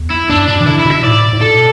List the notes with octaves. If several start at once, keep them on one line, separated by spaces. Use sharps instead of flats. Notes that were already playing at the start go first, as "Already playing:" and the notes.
Already playing: E2
E4
G2 D4
B2 D4
E3
D3 E4
E4
B2
E5
A2 D5
A2
B2 A4